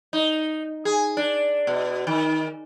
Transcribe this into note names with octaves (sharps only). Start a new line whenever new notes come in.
D#4
G#4
D4
B2
D#3